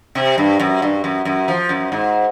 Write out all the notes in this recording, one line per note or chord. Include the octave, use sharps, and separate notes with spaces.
C3
G2
F#2
G2
F#2
F#2
F3
F#2
G#2